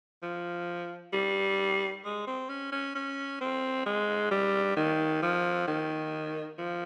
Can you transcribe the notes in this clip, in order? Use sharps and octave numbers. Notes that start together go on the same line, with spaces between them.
F3
G3
G#3
C4
C#4
C#4
C#4
C4
G#3
G3
D#3
F3
D#3
F3